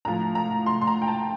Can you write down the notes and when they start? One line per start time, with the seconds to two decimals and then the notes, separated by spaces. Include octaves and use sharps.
0.05 A2 F3 A#5
0.35 A#5
0.66 C6
0.81 C6
0.87 A#5
1.02 G5
1.08 A5